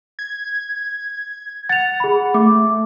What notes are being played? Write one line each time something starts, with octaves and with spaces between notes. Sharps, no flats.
G#6
F#5 A6 F7
G#4 B5
A3 D6